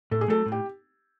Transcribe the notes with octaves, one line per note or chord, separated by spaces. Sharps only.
A2 A4
G#4
F#3 A3 A4
A2
G4